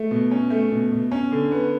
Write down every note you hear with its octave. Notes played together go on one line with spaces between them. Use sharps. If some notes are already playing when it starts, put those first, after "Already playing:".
Already playing: A3
B2
C#4
A3
B2
B2
C#4
D3
B3